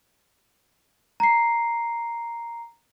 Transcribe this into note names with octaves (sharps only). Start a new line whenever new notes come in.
A#5 C7